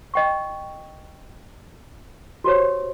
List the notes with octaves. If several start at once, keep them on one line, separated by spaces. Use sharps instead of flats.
D#5 G5 C#6
F#4 G4 C5 C#5